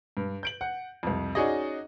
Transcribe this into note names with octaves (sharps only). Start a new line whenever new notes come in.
G2
G6 D7 F#7
F#5
C2 F2
C#4 D#4 F#4 G#4 D5 D#5